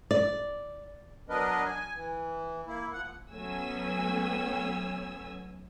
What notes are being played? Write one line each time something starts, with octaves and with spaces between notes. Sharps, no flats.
D5
F#3 B3 D4 A#4 B4 D#5
G#5
E3
A#3 E4
F3 F#5
F#3 A3 B3 C#4 G#5 E6